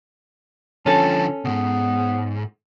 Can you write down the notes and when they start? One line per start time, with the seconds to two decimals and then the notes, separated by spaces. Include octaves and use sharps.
0.86 D3 F3 C#4 A4 A5
1.45 C2 G#2 B3